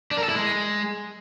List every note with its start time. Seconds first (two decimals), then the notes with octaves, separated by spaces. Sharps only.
0.11 D4
0.17 A#4
0.23 A4
0.29 E4
0.35 G#3